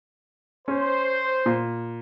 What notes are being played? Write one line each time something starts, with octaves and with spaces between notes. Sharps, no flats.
C#4 C5
A#2